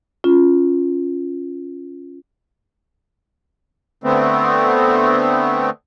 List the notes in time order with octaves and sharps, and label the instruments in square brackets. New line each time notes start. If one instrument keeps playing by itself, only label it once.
[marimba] C#4 F4
[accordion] D3 A3 B3 C4